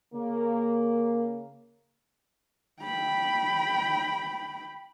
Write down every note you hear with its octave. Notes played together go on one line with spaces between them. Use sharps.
C#3 A#3
G5 B5